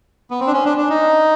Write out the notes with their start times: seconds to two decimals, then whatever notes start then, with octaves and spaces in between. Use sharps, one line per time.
0.31 B3
0.40 C4
0.47 D4
0.53 C#4
0.65 D4
0.78 D4
0.89 D#4